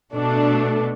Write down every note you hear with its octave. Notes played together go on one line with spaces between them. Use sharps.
B2 A3 D4